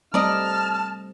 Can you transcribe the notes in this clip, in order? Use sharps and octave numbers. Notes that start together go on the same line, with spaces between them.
G3 A3 C4 A#4 D5 D#5 A5 F6